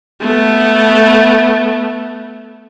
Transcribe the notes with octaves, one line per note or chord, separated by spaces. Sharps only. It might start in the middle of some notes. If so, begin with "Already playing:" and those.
A3 B3